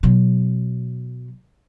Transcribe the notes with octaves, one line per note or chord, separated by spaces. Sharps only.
B2 F#3